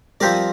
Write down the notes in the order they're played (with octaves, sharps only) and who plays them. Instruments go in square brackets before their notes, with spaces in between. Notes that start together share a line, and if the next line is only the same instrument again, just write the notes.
[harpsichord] F3 C4 G4 A#4 D5 [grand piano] G3